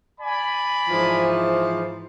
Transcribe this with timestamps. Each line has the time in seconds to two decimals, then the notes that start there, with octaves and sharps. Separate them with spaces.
0.21 D5 G#5 B5
0.88 G#2 E3 F3